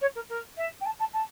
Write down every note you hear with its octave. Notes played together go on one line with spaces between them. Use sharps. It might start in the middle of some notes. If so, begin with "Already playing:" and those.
C#5
A#4
A#4
E5
G5
A5
A5
A5